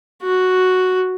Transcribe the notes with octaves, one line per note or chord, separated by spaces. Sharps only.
F#4